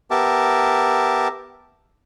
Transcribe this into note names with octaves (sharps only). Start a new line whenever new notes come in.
B3 G4 A#4 E5 A5